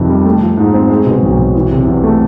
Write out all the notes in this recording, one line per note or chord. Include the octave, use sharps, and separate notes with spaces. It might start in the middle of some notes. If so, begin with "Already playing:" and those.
Already playing: F2 C3 D#3
G3
A3
F3
G#2
C4
G#3
B2
B1
B1
E3
C3
E2
A3